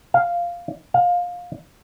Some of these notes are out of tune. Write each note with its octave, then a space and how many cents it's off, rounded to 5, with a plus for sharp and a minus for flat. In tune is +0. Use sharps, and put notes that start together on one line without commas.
F5 -5
F5 +20